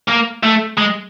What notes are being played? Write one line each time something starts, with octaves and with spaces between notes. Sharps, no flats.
A#3
A3
G#3